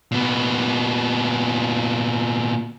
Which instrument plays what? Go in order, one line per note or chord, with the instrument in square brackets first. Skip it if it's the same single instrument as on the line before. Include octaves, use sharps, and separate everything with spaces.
[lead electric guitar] A#2 B3